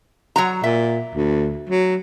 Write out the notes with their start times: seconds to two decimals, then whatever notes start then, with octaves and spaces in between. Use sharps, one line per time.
0.36 F#3 F#4 A#5
0.64 A#2 E5
1.15 D2
1.70 F#3